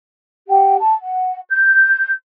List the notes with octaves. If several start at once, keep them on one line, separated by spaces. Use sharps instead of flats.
G4 F#5 G5
A5
F#5
G6